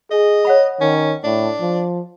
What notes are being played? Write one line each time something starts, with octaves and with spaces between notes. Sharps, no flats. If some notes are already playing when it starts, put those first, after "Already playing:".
G#4 D#5
C#5 F#5 B5
D#3 C#4
A2 D4
F3